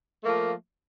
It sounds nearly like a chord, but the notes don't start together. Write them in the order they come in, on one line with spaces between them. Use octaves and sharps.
A3 A#3 F3